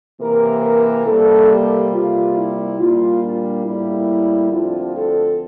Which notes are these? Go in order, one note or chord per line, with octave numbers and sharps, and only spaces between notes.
C3 E3 A#3 A#4
A#4
C3 G3 A#3 A4
G4
C3 G3 A#3 F4
E4
A#2 G3 A#3 F4
D4
A2 G3 A#3 E4
D2 D3 F3 C4 F4
A4